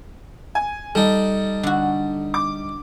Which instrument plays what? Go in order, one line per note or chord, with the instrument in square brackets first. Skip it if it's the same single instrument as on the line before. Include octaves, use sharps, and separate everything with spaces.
[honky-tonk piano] G#5
[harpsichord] G3 D#4 [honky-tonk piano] A4
[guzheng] D3 F#4
[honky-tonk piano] D6